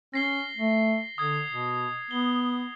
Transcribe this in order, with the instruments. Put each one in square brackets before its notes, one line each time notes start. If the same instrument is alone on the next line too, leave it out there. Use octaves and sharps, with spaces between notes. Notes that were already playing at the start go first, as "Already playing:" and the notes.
[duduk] C#4 [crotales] A#6 C7 G7
[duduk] A3
[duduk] D3 [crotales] D#6 G#6
[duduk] B2
[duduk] B3 [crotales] G7